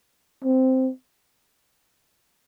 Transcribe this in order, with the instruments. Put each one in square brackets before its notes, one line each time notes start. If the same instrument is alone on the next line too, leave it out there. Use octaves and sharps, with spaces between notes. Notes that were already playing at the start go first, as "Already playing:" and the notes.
[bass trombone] C4